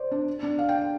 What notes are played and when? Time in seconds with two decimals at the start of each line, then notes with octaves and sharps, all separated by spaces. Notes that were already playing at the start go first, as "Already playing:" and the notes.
Already playing: C5 D5
0.11 D4
0.43 D4
0.59 F5
0.69 G5